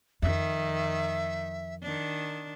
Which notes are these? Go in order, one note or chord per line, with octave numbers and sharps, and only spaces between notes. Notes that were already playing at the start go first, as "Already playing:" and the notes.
F2 D#3 E5
D#3 D4